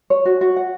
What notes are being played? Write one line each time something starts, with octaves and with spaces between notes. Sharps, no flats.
C#5
F#4
F#4
F#5